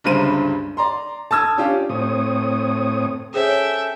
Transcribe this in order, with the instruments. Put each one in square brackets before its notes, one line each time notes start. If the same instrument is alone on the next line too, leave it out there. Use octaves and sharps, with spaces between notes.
[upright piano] G1 C#2 G2 C5 D#7
D5 A#5 C6
A5 D#6 E6 G#6
C#4 D4 F4 G4
[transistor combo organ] A2 C4 C#5 D#6
[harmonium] C#4 A4 [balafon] G#4 C5 C#5 [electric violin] E5 [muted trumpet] G5